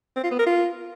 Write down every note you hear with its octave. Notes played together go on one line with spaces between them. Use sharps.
C4
F4
B3
A#4
F4